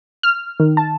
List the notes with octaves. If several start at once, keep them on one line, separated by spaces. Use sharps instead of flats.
F6
D#3
A5